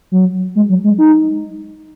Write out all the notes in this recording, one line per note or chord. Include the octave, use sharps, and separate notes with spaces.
F#3
G#3
F#3
G#3
D#4